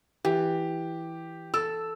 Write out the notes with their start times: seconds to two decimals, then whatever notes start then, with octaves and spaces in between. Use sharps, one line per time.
0.25 E3 G4
1.54 A4 E6